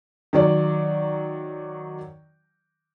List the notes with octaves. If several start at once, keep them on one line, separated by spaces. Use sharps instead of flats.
D#3 F#3 D5